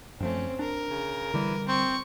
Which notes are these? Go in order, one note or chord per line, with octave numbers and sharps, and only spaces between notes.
F#2 F3 A3 C4 C#4
D4 A#4
C#3
D3 E3 G3
C4 C#6